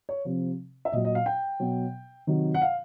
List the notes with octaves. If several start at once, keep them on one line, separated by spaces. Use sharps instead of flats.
C#5
C3 F3
E5
A#2 F#3 D#5
D#5
F5
G5
B2 F#3
C3 D#3 F#3
F#5
F5